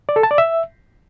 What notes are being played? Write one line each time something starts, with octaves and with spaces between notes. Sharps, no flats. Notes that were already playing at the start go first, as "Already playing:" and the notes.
D5
A4
A5
D5
E5